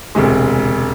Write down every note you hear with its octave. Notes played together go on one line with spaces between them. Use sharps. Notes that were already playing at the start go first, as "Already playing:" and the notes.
E1 D2 C3 G#3